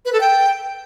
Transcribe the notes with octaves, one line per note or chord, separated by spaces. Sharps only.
B4
A4
G5